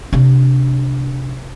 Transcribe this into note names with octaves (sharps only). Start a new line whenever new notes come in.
C3 D4